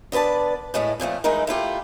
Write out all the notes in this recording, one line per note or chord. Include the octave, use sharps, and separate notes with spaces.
D3 B3 B4 D5 A5
A2 G#3 A3 E4
F2 A#2 F3 A3
E3 G#3 A3 D#4 E4 A#4
A3 E4 F4 G4